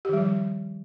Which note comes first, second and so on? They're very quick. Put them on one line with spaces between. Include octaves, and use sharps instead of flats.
G4 D#3 G3 F3